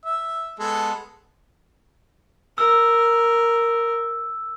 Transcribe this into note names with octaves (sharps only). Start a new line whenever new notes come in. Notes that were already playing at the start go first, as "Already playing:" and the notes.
E5
G#3 B3 A4
A#4 E6